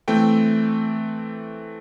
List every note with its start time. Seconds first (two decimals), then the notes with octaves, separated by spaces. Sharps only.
0.08 E3 A3 C4 G5